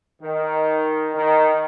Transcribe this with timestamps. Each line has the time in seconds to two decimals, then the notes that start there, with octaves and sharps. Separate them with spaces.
0.21 D#3
1.14 D#3